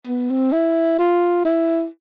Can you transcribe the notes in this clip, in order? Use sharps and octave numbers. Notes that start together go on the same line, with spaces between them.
B3
C4
E4
F4
E4